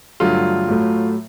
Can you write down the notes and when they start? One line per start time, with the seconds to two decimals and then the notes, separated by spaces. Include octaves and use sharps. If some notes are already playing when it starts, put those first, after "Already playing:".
0.20 G2 D3 F#3 A3 F4
0.68 A2 F#3 A3